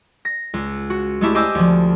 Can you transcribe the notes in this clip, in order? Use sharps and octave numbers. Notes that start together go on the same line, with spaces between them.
A#6
C#2
F#4
G#3 A3 E4 G4
G4 C5 D#5 G#5 D6 E6
D2 F3